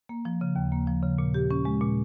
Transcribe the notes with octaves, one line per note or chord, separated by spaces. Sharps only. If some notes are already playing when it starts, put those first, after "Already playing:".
A#3
F3
C#3
D#2
A#3
F3
C#3
A#2
G4
C#4
G#3
A#2